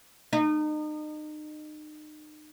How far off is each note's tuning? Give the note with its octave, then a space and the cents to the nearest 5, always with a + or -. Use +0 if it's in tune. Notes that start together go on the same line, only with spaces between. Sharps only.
D#4 -35